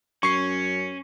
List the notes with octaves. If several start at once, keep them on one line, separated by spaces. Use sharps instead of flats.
F#2 C#4 C#6 C7